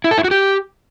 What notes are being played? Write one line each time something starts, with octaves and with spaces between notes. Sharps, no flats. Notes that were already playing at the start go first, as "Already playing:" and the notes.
E4
A4
E4
F#4
G4